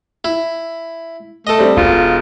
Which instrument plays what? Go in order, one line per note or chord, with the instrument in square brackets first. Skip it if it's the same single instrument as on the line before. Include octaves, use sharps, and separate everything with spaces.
[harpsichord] E4
[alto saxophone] A3 [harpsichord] A4 D#5
[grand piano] G3 C4 D4
[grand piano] E1 [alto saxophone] F4